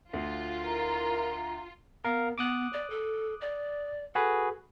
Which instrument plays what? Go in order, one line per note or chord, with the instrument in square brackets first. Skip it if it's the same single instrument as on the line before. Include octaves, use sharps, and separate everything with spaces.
[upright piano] D2 [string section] F4
[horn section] E4 A#4 [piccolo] A#5
[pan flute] B3 [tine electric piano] A#4 F5
[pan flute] B3 [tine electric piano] D6 D#6 F#6
[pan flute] D5
A4
D5
[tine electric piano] F#4 G#4 B4 [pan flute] A4